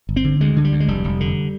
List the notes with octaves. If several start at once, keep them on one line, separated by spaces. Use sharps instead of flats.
G1
C4
D3
D2 G#3
D3
G3
D2
G#3
F1 G3
F1
D3